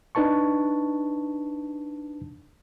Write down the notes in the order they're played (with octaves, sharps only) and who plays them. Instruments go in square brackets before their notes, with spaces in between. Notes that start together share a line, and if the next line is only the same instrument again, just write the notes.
[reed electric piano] D4 D#4 B4 A5 C#6